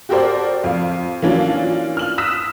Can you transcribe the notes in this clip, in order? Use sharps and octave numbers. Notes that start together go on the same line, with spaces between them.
F#4 G4 A4 A#4 C5 D5
F2 F5
E3 F#3 A#3 C#4 D4 F4
F6 F#7
D#6 E6 F#6 B6 E7